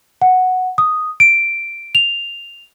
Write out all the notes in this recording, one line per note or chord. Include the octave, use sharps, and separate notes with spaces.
F#5
D#6
D7
F7